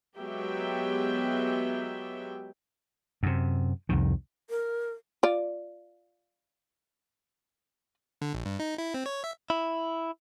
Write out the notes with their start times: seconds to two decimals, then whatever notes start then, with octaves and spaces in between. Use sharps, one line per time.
0.18 F#3 G#3 B3 G4 E5 G5
3.23 F#2 C3
3.89 C2 F2 D#3
4.50 A#4
5.23 F4 D5
8.22 D3
8.34 A#1
8.46 G2
8.59 D#4
8.78 E4
8.94 C4
9.06 C#5
9.24 E5
9.50 E4